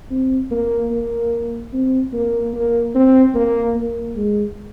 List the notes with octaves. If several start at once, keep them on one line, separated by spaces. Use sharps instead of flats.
C4
A#3
A#3
C4
A#3
A#3
C4
A#3
A#3
G#3